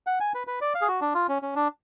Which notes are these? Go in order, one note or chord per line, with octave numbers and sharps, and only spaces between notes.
F#5
G#5
B4
B4
D5
F5
G#4
F#4
D4
F4
C#4
C#4
D4